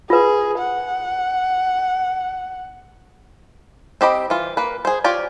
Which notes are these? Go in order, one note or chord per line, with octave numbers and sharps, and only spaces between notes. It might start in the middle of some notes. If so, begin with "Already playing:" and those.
F4 G#4 B4
F#5
C4 G4 D#5 B5
E3 F4
A#3 B4
G#4 C5
F4 G4 C#5 D5